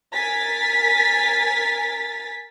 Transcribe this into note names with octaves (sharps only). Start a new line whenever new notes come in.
A#4 G#5 A6 B6